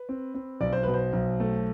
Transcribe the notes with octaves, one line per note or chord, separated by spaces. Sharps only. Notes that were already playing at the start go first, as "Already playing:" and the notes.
Already playing: B4
C4
C4
B1 D5
C5
B2 B4
C5
B1
A3